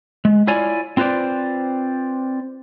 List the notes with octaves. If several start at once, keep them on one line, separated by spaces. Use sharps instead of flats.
G#3
E4 F4 C#5 D5 G#5
C4 F4 B4 C5 D5